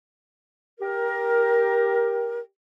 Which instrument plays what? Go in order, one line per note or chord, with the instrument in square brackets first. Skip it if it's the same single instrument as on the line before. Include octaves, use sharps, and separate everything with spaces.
[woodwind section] G4 A#4